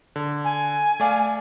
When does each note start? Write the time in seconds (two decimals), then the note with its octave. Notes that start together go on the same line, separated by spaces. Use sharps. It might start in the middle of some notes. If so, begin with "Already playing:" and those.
0.16 D3
0.44 G#5
1.00 A3 D5 F5